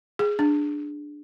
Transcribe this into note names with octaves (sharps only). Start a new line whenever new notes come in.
G#4
D4